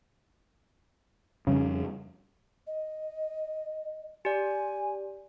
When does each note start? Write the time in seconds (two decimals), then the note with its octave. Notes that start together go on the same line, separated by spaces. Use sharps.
1.47 F2 C#3 G3
2.67 D#5
4.25 G4 D5 G#5